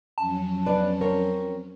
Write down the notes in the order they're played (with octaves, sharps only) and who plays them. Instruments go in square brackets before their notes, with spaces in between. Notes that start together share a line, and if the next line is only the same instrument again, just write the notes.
[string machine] F2 F#3 C#4 [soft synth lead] A5
[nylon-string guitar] B3 B4 [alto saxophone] D4
[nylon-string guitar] C4 C#5 [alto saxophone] A#4